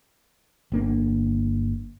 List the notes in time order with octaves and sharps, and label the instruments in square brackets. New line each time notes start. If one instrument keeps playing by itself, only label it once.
[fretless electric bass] G1 A#3 D4